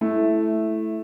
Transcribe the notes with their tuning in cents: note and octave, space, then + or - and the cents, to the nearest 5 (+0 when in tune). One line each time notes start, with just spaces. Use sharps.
A3 -10 E4 +0